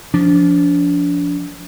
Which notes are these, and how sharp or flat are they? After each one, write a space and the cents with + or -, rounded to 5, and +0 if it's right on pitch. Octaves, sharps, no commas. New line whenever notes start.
F3 +0 D4 -30